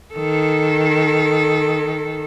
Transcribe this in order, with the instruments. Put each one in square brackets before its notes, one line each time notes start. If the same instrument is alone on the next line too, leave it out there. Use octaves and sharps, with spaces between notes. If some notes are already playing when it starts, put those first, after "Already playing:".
[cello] D#3 A4